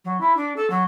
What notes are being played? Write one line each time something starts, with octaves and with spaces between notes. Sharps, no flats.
F#3
E4
D4
A4
F#3